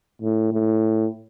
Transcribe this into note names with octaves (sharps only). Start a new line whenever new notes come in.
A2
A2